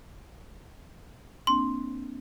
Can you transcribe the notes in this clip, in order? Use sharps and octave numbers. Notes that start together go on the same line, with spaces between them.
A#3 C4 D4 C6